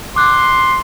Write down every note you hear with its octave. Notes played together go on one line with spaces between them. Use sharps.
C6 D6 F#6